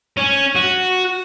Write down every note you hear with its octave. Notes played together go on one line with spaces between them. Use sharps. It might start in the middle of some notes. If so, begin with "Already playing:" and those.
C#4
F#4